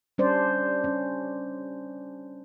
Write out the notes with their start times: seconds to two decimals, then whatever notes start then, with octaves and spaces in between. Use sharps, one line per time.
0.18 G3 C#4 D4 C5 D5
0.84 C#4